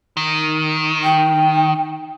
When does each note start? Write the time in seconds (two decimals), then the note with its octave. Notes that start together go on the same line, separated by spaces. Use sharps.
0.17 D#3
1.04 G5